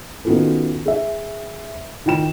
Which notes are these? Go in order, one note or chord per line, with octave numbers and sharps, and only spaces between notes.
D#3 B3 C#4 F4 F#4 A4
G#4 E5
D#3 F4 G5 E7